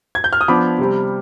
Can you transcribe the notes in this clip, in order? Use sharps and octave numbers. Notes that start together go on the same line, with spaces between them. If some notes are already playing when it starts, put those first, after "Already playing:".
G#6
G6
F6
D#6
F3 B3 D4 B5 D6
C3 G3 C4